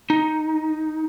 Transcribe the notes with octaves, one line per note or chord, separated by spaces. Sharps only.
D#4